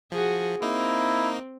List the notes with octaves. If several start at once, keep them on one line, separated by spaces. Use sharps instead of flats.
F3 F#4 G#4
A#3 C4 D#4 E4